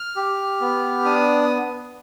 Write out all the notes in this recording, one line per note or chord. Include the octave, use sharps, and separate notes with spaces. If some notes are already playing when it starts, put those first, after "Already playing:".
Already playing: F6
G4
B3
D4 D#6